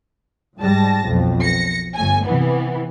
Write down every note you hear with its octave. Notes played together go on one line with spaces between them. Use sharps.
G#2 G3 A5 A#6
B1 F2
A#6 C#7
G1 A3 G#5
C3 E3 B3